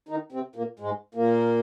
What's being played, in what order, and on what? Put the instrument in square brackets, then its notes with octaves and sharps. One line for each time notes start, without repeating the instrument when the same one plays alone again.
[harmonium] D#3 D#4
C3 C4
A#2 A#3
G#2 G#3
A#2 A#3